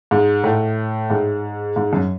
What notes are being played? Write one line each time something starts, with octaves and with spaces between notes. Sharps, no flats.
G#2
A2
G#2
G#2
F#2